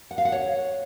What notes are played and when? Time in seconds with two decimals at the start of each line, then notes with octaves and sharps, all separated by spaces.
0.11 F#5
0.18 F5
0.25 F#5
0.32 C#5